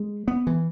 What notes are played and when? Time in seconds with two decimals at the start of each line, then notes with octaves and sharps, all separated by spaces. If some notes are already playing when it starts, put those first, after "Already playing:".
Already playing: G#3
0.28 B3
0.47 E3